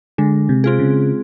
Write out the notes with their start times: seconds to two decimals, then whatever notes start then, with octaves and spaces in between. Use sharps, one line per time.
0.18 D3 G#3
0.49 C3
0.64 C4 F4 G#4
0.79 C#3